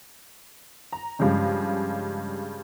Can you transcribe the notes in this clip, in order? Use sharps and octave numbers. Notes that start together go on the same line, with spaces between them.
A#5
G2 C#3 F3 G#3 C#4